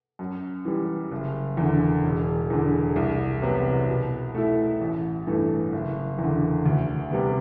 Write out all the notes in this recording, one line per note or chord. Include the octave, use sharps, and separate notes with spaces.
F#2
E3 G3
F#1
E2 D3
E1
E2 D3
C2
C3 F#3 B3
B2
A3 E4
A1
G2 E3 A3
F#1
E2 D3
D2
C3 G3 B3